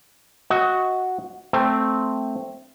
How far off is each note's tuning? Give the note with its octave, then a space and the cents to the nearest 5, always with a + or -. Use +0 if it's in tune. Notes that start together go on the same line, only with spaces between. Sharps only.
F#4 +0 D#5 +30
A3 +0 C4 +0